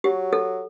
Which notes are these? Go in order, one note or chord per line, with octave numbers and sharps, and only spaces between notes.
F#3 G4
A4